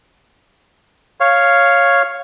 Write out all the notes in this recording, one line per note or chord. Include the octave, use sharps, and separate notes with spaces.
C#5 F5